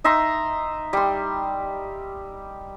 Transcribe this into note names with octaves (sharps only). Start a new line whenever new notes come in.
D#4 E5 A#5 C6
G3 C6